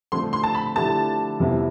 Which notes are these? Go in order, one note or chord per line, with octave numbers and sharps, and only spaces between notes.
D3 F3 A3 C4 C6
C6
A5
B5
D3 F3 A3 E4 G4 A5
F2 C3 F3 B3 E4